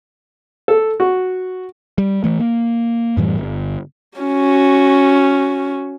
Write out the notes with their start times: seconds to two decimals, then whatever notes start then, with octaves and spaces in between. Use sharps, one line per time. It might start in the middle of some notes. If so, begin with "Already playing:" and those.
0.68 A4
1.00 F#4
1.98 G3
2.24 E3 A3
2.40 A#3
3.17 F#2 A2 E3 G3
3.38 G1
4.18 C#4 F#4